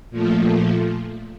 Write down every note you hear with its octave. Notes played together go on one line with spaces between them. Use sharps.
A#2 F3 A3